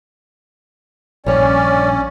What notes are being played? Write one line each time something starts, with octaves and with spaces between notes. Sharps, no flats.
A#1 G2 C#4 C#5 D5